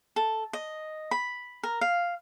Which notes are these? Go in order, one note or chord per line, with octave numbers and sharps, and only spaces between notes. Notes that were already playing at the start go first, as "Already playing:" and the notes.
A4
D#5
B5
A#4
F5